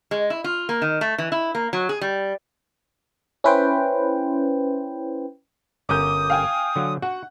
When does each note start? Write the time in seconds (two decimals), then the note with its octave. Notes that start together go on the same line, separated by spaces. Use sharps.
0.11 G#3
0.30 E4
0.44 F4
0.69 A#3
0.82 D#3
1.01 A3
1.18 E3
1.32 E4
1.55 A#3
1.73 F#3
1.89 G#4
2.01 G3
3.44 C#4 E4 B4 C5 G5
5.89 G1 C#4 A#4 D6 D#6 G6
6.30 F5 G5 G#5
6.76 D3 F#3
7.02 F#4 F#5